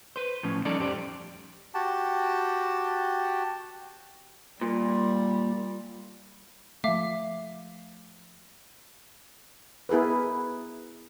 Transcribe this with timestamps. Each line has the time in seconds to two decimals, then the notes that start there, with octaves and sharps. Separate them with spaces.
0.16 B4 C5
0.43 A2 F3 C#4
0.65 F3 G3 C#4 D#4 A4 D5
0.79 F2 G4 C5 D5
1.74 F#4 G4 A5
4.61 A#2 G3
6.84 F3 A3 E5 F5 D6
9.89 B3 E4 G#4 A#4 B4